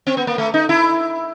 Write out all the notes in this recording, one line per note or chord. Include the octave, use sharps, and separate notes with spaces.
C4
B3
A#3
A3
D#4
E4